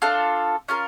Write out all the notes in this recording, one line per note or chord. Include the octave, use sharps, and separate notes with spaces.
D4 F4 A4
C#4 F4 A#4